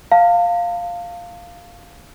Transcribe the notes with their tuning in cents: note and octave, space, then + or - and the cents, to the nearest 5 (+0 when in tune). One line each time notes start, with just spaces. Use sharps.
F5 +0 A5 +40